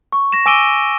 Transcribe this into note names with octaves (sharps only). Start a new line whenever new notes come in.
C#6
A#6 E7
G#5 D6 E6 D7 D#7 G7